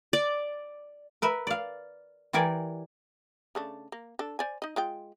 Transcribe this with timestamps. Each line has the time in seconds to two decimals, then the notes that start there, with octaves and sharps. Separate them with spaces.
0.13 D5
1.22 A#4 B4 E5
1.47 D5 F5
2.33 E3 G4 A#4 D5 G#5
3.55 C#3 A3 D4
3.92 A#3
4.19 D4 A4
4.39 C5 D5 G#5
4.62 D#4 D#5
4.76 G#3 F4 G5